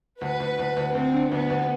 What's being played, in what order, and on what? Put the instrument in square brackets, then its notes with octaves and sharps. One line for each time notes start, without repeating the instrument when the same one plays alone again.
[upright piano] D2 [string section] B4
[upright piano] D2
D2
D2
[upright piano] D2 [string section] C4
[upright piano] D3
[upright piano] D2 [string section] B3
[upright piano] D2